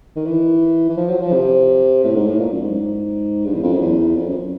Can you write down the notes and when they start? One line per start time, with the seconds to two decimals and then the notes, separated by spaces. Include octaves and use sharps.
0.16 D#3
0.26 E3
0.89 E3
0.97 F3
1.10 F#3
1.21 F3
1.33 C3
2.04 A2
2.15 G#2
2.27 A2
2.39 A#2
2.51 F#2
2.63 G#2
3.46 G2
3.54 E2
3.63 F2
3.72 F#2
3.81 E2
4.16 F2
4.29 F#2